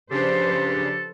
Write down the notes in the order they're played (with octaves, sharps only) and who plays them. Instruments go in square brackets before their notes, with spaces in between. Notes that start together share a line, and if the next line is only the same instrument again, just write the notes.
[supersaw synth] C#3 D4 [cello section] F3 B4 C5 [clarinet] G4 [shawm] A4